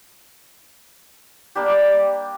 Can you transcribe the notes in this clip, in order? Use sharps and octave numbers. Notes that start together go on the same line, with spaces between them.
G3 A#3 D4 G4